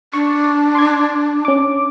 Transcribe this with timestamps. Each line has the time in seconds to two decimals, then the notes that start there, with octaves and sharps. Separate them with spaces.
0.13 D4 C#6
0.75 C6 D6 G#6
1.45 C#4 D6